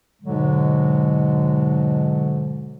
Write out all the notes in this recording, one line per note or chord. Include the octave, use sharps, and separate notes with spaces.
G#2 B2 D3 F#3 G#3